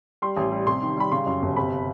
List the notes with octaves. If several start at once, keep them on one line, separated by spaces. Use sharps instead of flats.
G3 C6
A1
G3
C3 C6
D#3
G3 B5
C#3 C6
F#2
G1
C3 B5